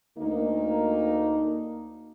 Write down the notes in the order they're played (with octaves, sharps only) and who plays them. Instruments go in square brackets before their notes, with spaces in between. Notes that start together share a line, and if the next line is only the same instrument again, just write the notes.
[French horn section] D2 A#3 D#4